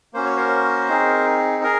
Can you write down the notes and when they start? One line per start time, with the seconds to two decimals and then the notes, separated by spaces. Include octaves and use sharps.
0.13 A#3 C#4 F#4 C5
0.26 C#5
0.36 A#4 C5
0.89 C4 D#4 G#4
1.63 G#4 A#4